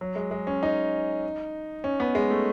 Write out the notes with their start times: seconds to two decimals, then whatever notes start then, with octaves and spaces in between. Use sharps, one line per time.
0.01 F#3
0.16 G#3
0.31 G#3
0.47 C#4
0.63 D#4
1.84 C#4
2.00 B3
2.15 G#3
2.31 A3